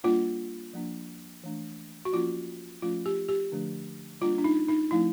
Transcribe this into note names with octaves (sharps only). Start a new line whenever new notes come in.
G3 A#3 D4 F4
F3 A#3 D4
E3 A3 D4
F#4
F3 A#3 C#4 F4
F3 A3 C#4 F4
G4
G4
D3 F3 A3 D4
G3 A#3 D4 F4
D4
D#4
D#4
F3 A3 C4 E4